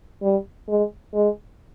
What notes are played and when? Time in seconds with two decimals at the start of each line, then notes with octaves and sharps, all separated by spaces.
0.22 G3
0.69 G#3
1.14 G#3